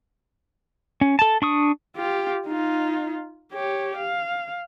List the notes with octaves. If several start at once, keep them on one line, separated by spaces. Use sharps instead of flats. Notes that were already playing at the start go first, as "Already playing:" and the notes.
C#4
A4 A5
D4 C#6 D#6
F4 G4
D#4 F4
G4 C#5
F5